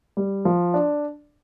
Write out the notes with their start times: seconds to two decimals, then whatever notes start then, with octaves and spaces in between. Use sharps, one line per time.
0.17 G3
0.45 F3
0.74 D4